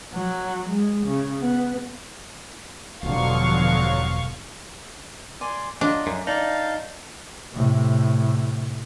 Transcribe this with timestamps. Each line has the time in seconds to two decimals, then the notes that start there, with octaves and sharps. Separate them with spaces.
0.13 F#3
0.69 G#3
1.07 C#3
1.40 B3
3.03 E1 G2 B2 D3 F3 F#3 F5 C#6
5.41 D5 G#5 C6 D6
5.81 F#3 D4 F4 D#5
6.07 F#2
6.27 D#4 D5 F5 A5
7.53 A2 C3